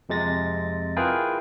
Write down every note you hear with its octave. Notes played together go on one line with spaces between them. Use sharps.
F2 C3 G#3 A6 A#6
E4 F4 G#4 A#4 B4 G5